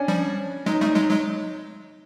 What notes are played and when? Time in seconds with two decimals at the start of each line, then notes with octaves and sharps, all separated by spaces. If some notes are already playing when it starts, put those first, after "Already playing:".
Already playing: C#4 D4
0.08 F3 G3
0.66 F#3 G#3 D#4
0.81 G3 A3 D#4
0.96 F#3 G#3
1.10 F#3 G#3